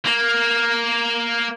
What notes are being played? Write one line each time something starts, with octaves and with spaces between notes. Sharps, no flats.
A#3